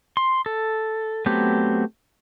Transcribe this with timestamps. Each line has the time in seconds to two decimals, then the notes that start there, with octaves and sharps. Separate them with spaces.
0.17 C6
0.46 A4
1.26 F#3 A3 B3 C4 G4